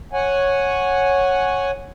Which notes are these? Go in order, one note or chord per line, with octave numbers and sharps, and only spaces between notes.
C#5 F#5 G#5